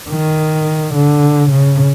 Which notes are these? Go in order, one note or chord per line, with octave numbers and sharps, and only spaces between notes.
D#3
D3
C#3